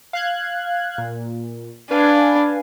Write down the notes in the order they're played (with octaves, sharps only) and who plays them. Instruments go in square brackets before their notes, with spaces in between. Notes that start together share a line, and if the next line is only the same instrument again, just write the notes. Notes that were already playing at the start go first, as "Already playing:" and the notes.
[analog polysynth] F5 F#6 G#6
A#2
[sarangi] D4 [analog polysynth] B4 F5 G#5